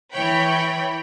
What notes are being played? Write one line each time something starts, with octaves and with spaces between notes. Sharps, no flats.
E3 C#5 G5 B5